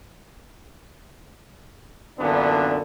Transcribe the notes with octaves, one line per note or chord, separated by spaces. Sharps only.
F#2 A#2 D3 E3 B3 D4